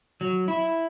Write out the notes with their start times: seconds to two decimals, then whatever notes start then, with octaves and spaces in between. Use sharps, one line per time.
0.21 F#3
0.48 E4